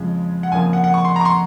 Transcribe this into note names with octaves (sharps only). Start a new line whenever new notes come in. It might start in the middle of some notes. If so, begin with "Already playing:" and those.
Already playing: F2 C#3 F3 G#3
F#5
F2 C#3 F3 A#3 G#5
F#5
F#5
C#6
C6
A#5
C#6
C6